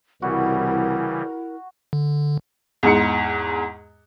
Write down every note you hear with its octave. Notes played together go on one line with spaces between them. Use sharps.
C2 C#3 E3 G3 E4 F#4 A#4
D3
E2 G#2 C#7